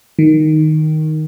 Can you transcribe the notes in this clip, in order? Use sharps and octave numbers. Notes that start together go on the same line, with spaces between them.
D#3